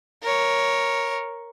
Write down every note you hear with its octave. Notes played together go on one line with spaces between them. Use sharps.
A#4 C#5